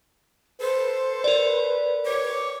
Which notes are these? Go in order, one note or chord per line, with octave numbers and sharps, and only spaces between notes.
A4 B4 C5
A#4 D5
C#5 D6